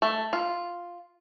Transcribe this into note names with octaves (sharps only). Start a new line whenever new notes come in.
A3
F4